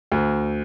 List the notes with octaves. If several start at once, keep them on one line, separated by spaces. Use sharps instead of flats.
D2